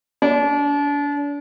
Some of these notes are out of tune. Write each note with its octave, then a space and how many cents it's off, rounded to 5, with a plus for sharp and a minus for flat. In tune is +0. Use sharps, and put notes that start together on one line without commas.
D4 -35